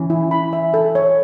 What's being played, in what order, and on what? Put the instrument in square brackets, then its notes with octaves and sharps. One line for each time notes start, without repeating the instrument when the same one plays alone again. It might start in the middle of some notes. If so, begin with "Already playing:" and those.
Already playing: [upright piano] E3 [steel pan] C#4
[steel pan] E4
B5
E5
A4
C#5